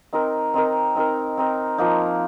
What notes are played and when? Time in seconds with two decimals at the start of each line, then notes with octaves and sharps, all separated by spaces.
0.13 C4 D#4 A#4
0.54 C4 D#4 A#4
0.95 C4 D#4 A#4
1.38 C4 D#4 A#4
1.78 F3 A#3 D#4